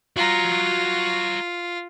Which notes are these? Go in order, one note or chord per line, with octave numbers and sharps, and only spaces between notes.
F4 F#4 A#5